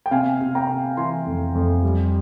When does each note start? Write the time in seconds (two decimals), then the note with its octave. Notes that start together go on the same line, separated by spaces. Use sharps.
0.06 G5
0.11 C3 F5 G#5
0.41 C3
0.55 G5 A#5
0.69 C3
0.97 E3 G#5 C6
1.26 F2
1.55 F2
1.83 G3